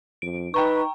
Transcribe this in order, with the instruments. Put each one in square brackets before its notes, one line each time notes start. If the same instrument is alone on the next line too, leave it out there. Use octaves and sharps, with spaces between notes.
[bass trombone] F2 [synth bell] D7
[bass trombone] D#4 [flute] B4 [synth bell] G5 A#5 C#6